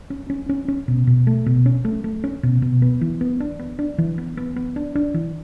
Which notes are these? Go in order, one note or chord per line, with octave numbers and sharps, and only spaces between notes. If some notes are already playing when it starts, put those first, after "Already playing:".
C#4
C#4
C#4
C#4
B2
B2
A3
B2
C#4
A3
A3
C#4
B2
B2
B3
E3
B3
D4
B3
D4
E3
B3
B3
B3
D4
D4
E3